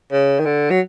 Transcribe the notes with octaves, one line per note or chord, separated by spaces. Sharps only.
C#3
D#3
D3
F#3